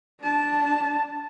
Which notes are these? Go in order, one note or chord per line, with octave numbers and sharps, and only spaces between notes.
D4 A5